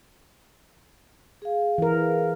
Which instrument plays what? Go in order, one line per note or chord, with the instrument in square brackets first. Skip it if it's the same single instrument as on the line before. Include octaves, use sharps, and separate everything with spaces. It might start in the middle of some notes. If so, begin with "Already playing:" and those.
[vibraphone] G#4 F5
[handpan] E3 A#4